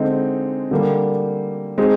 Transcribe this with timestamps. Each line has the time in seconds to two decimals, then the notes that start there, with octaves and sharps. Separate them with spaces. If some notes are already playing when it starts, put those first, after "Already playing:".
Already playing: D3 G#3 C4 D#4
0.71 D3 G3 A#3
1.78 G#3 C4 D#4 G#4